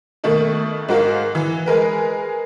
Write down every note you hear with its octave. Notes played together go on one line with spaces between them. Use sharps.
B2 D#3 A3 A#3
G#2 F#4 A#4 F5
E3
G#3 G#4 A#4 B4